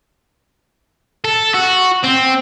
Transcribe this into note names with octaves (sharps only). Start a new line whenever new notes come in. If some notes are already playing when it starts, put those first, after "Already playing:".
A4
F#4
C4